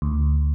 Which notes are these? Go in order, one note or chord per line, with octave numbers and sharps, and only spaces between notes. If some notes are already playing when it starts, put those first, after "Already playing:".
D2